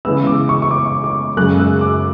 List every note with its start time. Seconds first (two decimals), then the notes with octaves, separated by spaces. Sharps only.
0.05 C#3 E3 G#3 B3 E6
0.27 D6
0.49 C#6
0.62 C#6
0.71 D6
1.04 D6
1.37 F#2 C#3 G#3 F#6
1.59 E6
1.81 D6